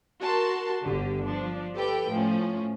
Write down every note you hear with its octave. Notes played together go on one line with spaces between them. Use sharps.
F#4 A#4 A5 C6
G1 D3 G4
F3 D4
G4 A4 B4 G5
A2 F3 C#4